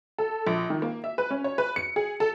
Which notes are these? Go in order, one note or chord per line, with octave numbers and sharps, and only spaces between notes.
A4
A#1
D#3
A#3
E5
B4
C#4
C#5
B4
C#7
G#4
A4